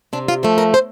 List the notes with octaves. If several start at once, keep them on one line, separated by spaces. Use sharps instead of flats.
C3 D4
F4
F3 A3
A#4
C5